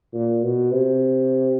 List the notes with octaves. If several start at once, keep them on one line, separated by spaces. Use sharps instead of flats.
A#2
B2
C3